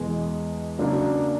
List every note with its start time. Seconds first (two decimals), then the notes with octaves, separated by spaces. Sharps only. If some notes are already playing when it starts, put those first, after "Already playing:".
Already playing: E2 B2 G#3
0.79 C#3 F#3 A#3 D4